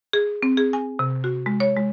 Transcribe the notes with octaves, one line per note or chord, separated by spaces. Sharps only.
G#4
C4
G#4
G#5
C3
F#4
G#3
C#5
G#3